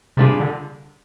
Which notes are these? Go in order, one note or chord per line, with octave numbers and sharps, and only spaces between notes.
C3 G3 A#3 D4 F4 G#4
D3